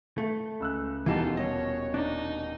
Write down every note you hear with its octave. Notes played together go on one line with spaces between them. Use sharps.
A3
C#2 E6 F#6
D#1 B2 E3 G3 D#4 F4 A4 E7
C#5 D#5
D4 D#4